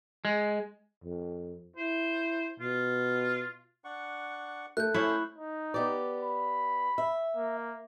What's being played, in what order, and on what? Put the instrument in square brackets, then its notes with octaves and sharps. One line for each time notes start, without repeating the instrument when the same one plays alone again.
[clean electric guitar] G#3
[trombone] F2
[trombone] E4 [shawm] C5
[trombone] B2 [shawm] F4
[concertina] D4 F#5 C#6
[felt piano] A3 [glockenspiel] F#6 G6
[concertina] C#4 C5 [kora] E4 C#5
[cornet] D#4
[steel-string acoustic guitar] B3 G4 D5
[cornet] B5
[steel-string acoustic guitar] E5
[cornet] A#3